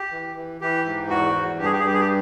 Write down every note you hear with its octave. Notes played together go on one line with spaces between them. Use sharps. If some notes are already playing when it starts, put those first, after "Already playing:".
Already playing: G4
E3
E3
E3 G4
G#2
E2 F#4
E2
G2 G4
G#4
G4
G#4
G2 G4
G#4
G4